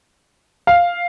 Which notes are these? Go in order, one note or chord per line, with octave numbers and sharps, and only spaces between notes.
F5